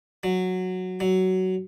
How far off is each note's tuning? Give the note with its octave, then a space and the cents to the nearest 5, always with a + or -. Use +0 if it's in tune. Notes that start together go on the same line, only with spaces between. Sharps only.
F#3 -5
F#3 +15